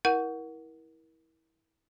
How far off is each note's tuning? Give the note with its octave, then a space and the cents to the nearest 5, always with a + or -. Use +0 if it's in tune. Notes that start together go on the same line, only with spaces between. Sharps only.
E4 -20 A#4 +25 F#5 +0